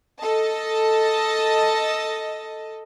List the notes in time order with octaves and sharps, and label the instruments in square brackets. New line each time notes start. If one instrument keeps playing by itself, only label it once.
[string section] A4 D#5 A5